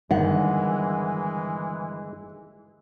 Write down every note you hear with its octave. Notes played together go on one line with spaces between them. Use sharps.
G1 D#3 E3 G#3 F#5